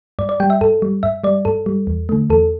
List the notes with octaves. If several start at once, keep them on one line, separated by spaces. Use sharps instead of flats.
G2 D5
D5
G3 G5
E5
G2 A4
G3
G2 E5
G3 D5
G2 A4
G3
E2
D3 A3
E2 A4